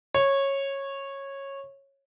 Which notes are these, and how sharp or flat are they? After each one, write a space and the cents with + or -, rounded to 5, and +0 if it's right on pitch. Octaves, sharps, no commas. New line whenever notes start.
C#5 -15